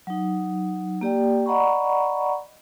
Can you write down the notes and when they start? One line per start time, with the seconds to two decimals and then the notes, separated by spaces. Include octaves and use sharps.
0.07 F#3 D#4
1.01 A#3 G4 D5 G5
1.46 D5 D#5 F#5 A#5 B5 C#6